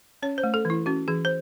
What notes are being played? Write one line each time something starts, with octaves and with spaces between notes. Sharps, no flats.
C#4 C#5
C5
A3
A4
E3 E4
C#4 F#4
E3 G#4
C5